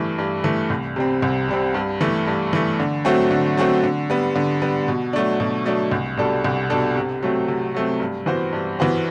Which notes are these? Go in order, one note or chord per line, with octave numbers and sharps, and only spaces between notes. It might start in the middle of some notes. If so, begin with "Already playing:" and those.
Already playing: G2 E3 A3
G2
E3 A3
C2
C3 G3 C4
C2
C3 G3 C4
G2
E3 A3
G2
E3 A3
D3
F#3 A3 C4 F#4
D3
F#3 A3 C4 F#4
D3
G3 B3
D3
G3 B3
B2
F#3 A3 D4
B2
F#3 A3 D4
C2
B2 G3 D4 A4
C2
B2 G3 D4 A4
C3
F#3 A3 C4
C3
F#3 A3 C4
G2
E3 B3 F#4 C5
G2
E3 B3 F#4 C5